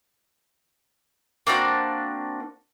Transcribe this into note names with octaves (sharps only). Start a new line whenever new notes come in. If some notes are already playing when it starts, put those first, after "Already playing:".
A#3 C4 D4 F#4